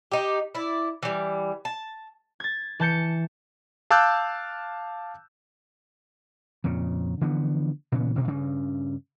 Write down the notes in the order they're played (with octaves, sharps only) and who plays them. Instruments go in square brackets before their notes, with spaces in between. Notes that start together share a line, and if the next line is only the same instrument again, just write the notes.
[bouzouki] D#4 G4
E4 D5
E3 G3
A5
[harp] G#6 A6
E3 A5 G6 C#7
[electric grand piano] F5 A5 D6 E6 F#6 G6
[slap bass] F2 A#2 C#3
D3 E3 F3 B3
A#2 C#3 E3 B3
A1 G2 B2
G2 C#3